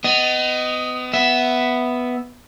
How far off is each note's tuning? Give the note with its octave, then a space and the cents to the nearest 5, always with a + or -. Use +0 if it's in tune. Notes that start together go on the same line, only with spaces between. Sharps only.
B3 +35 D#5 +0
B3 +5 E5 +0